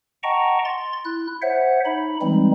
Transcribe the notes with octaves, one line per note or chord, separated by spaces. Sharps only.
D#5 F#5 G5 A5 A#5 C#6
C6 A6
E4 F#6
C5 C#5 E5 F#5
D#4 B5
E3 G3 G#3 C4 D#4